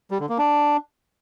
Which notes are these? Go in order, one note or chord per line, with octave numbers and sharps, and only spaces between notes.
G3
D3
A#3
D4